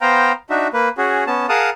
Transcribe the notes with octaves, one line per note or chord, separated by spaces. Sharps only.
B3 C5 F5 G5 A#5
D4 D#4 F#4 E5
A#3 B4
C#4 F#4 G#4
B3 C#4 A5
G#4 A#4 F5 F#5 A5 D#6